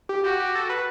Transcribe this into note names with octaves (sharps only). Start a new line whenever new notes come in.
G4
F#4 G4
G4
A4
B4